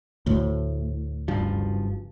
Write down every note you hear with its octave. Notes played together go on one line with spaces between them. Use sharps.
D2 A2
F#1 G2 F3